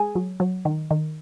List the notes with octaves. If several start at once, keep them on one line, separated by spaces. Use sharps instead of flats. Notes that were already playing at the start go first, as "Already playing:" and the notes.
Already playing: G#3 G#4 G#5
F#3
F#3
D#3
D#3